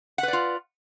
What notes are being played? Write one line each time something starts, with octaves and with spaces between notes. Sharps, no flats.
F4 B4 D5 F#5